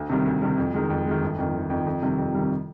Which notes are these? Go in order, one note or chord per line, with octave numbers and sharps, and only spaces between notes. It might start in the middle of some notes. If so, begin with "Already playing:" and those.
Already playing: D2
C3 D#3 G3
D2
C3 D#3 G3
F2
D#3 G#3
F2
D#3 G#3
G1
F2 D#3
G1
F2 D#3
F2
C3 D#3 G3
F2
C3 D#3 G3